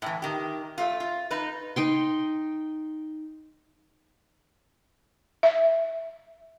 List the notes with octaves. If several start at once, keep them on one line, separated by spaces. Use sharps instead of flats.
A2 E3
D#3 G4
A3 F4
F4
D#4 B4
D#4 G5 C6
E5